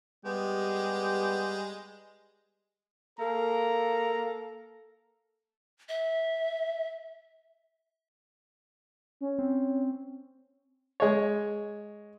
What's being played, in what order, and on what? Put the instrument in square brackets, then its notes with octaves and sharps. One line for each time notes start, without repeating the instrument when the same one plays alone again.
[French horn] G3 [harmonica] G#3 [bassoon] B3 [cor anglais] G4
[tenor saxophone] A#3 [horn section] A4 [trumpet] A#5
[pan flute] E5
[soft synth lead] C#4
[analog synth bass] C4
[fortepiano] G#3 C#5